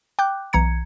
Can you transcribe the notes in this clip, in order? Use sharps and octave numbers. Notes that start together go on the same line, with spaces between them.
G5 D6 F#6 G6
B1 E3 A#5 G#6 C#7